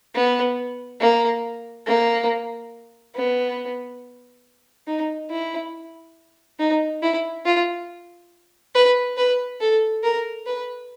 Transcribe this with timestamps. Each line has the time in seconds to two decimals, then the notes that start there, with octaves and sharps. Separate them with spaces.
0.15 B3
1.01 A#3
1.87 A#3
3.15 B3
4.87 D#4
5.30 E4
6.60 D#4
7.03 E4
7.45 F4
8.75 B4
9.17 B4
9.61 A4
10.03 A#4
10.47 B4